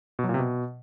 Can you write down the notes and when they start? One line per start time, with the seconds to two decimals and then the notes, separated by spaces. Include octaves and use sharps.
0.19 B2
0.24 F#3
0.29 A#2
0.34 C3
0.39 B2